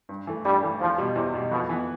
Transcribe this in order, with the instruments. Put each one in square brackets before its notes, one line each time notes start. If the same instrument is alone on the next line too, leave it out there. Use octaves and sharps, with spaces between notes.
[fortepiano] G2
E3 A3
[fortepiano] G2 [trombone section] G3
[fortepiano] E3 A3
[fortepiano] E2 [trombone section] F3
[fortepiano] B2 G3
[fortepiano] E2 [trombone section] C3
[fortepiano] B2 G3
[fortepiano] F2 [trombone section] B2
[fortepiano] E3 B3